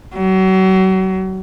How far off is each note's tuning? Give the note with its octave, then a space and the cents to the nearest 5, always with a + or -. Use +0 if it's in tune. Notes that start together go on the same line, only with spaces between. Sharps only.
F#3 +35